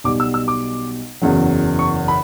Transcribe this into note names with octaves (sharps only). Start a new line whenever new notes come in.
B1 B2 G3 D6
E6
E6
D6
F#1 E2 C#3 F#3
C#6
B5